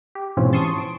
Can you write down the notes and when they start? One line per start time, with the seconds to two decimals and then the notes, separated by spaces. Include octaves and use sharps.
0.15 G4
0.37 G#2 B2 E3 F3 C4 C#4
0.53 A5 C6 C#6 D#6
0.78 D7